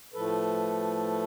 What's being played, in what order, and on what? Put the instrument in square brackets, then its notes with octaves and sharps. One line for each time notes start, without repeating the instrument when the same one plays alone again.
[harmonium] A2 F3 A3 A4 B4